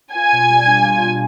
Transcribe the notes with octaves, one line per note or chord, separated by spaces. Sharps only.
F4 G#5
B2
G3
D4
F4
B2